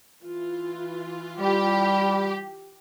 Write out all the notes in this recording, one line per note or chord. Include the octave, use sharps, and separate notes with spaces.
E3 F4
G3 G4